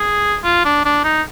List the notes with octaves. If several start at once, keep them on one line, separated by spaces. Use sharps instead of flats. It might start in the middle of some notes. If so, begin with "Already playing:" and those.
Already playing: G#4
F4
D4
D4
D#4